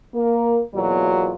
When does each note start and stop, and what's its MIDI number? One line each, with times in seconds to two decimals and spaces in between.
0.15 0.61 58
0.15 0.61 70
0.75 1.34 40
0.75 1.34 47
0.75 1.34 54
0.75 1.34 58
0.75 1.34 65
0.75 1.34 74